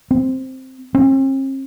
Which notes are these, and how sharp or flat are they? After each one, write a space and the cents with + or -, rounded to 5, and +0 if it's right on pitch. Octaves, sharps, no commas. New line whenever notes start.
C4 +0
C4 +45